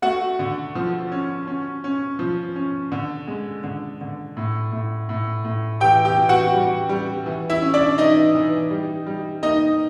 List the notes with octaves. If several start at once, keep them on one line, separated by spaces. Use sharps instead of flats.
A3 F#4 F#5
D3
F3
C#4
C#4
C#4
F3
C#4
D3
G#3
D3
D3
A2
A2
A2
A2
E3 G4 G5
G4 G5
E3
F#4 F#5
G3
G3
E3
E4 E5
C#4
D4 D5
E3 D#4 D#5
E3
G3
G3
A#3 D#4 D#5